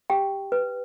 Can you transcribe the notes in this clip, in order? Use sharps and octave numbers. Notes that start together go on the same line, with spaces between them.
G4 G5
B4